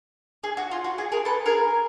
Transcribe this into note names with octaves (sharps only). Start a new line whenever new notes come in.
G#4
F#4
F4
F#4
G#4
G#4 A#4
A4 B4
G#4 A#4